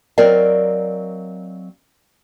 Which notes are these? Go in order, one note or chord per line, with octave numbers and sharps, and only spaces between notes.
F#3 C4 A#4 D5 D#5 F5